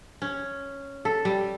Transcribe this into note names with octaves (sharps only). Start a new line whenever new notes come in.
C#4
A4
G3